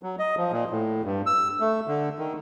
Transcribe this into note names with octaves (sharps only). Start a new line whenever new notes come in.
F#3
D#5
F3
A#2
A2
G2
E6
A3
D3
D#3